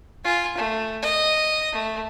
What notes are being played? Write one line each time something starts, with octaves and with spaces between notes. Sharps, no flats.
F4 G#5
A3
D#5
A3